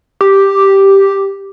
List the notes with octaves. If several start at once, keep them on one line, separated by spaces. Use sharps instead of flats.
G4